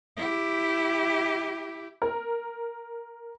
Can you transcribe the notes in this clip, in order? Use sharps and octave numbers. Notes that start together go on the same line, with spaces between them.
E4 G4
A#4